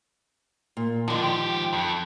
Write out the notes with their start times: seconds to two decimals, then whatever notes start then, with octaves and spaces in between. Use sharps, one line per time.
0.77 A#2
1.08 A2 D3 D#3 F3
1.22 G#2 G4
1.73 F2